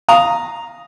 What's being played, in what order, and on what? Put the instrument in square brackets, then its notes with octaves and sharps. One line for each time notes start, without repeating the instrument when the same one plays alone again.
[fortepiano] F5 A#5 D#6